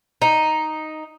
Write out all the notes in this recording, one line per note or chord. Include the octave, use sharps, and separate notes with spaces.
D#4